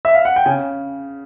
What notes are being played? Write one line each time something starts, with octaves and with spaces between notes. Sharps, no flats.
E5
F5
F#5
G5
C#3 G#5